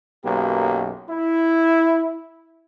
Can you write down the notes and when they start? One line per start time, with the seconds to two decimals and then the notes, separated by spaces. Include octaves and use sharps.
0.25 B1 F#2 A#3 B3 G4
1.09 E4